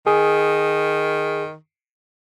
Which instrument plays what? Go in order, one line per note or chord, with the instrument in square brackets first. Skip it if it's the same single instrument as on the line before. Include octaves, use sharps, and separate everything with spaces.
[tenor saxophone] D#3 [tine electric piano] G#4